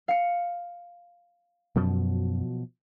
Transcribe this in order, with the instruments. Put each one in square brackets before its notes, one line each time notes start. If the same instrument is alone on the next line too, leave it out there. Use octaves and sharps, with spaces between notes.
[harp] F5 C#7
[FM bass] F#2 [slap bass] B2 F3 F#3